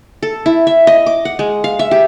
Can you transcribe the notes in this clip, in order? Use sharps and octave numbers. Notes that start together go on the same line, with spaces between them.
A4
E4
E5
D#5
D6
F#5
G#3
F5
E5
G4